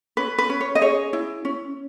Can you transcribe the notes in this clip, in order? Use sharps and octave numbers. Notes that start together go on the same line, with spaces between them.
C#4 B4
B4
C#4
C#5
D#5
G#4 C#5
E4
C#4